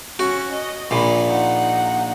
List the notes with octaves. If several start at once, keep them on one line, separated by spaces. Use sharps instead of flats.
C#4 F#4
D#5
A#1 A#2 B5
D#4 F#5